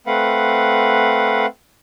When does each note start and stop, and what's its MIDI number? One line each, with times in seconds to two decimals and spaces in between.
0.07 1.46 57
0.07 1.46 60
0.07 1.46 71
0.07 1.46 77
0.07 1.46 78